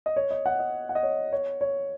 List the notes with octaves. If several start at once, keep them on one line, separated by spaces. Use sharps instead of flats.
D#5
C#5
D#5
F#5
D#5
F#5
D#5
C#5
C#5
C#5